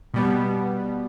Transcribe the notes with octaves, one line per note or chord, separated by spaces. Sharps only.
B2 G3 B3